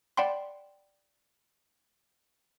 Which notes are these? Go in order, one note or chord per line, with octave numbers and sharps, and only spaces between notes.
D5 F#5 G5 B5 C6